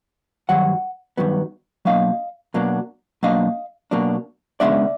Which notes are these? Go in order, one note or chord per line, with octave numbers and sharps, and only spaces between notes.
G2 D#3 F#3 F#5
G2 D#3 F#3 B3
B2 F#3 A#3 D4 D#5 F5
B2 F#3 A#3 D4
B2 F#3 A#3 D4 D#5 F5
B2 F#3 A#3 D4
C#3 E3 G#3 B3 D4 D5 E5